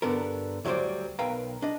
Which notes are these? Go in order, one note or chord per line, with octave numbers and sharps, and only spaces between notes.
G2 D3 B3 A4 A#4
D2 F#3 G3 D4 C5 D5
B1 A#4 B4 F5 G5 A#5
D4 D#5